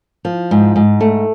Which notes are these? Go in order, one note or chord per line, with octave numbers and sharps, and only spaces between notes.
F3
G#2
G#2
A3